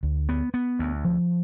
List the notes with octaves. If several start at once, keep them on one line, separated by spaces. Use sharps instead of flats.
D2
B3
B3
D2
F3